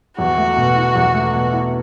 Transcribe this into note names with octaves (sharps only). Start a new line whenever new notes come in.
E2 F#4
A3
B2
E4
E2
A3
B2
E4